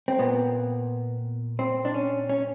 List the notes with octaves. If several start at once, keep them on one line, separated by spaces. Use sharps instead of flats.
C4
A#2 B3
C4
D4
C#4
C#4